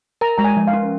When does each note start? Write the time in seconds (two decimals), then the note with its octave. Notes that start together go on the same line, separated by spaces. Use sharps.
0.21 A#4 A#5
0.38 G#3 A#5
0.44 G#5
0.57 F3
0.67 F5
0.73 C#4